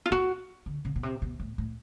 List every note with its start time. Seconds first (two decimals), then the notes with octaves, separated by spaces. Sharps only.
0.06 F4
0.11 F#3 F#4
0.66 D3
0.85 C#3
0.96 B2
1.03 C3
1.22 B2
1.40 A2
1.58 A2